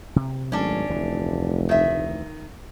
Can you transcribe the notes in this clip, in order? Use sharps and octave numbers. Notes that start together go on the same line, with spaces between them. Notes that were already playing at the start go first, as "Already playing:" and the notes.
C3
G#1 F#3 A3 C#4 D4
F1 D2 E3
D#3 E5